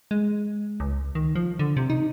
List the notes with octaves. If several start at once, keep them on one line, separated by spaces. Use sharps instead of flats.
G#3
C#2
D#3
F3
D3
C3
D#4